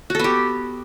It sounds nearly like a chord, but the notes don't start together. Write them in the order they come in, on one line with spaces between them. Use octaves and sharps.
F#4 A4 B3 G4